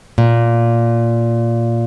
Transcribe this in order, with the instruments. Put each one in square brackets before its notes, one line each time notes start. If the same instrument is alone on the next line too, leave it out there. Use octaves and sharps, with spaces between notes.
[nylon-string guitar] A#2